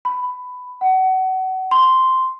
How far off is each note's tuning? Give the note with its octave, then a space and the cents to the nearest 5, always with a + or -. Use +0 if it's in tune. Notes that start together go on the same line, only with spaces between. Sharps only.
B5 +15
F#5 +30
C6 -5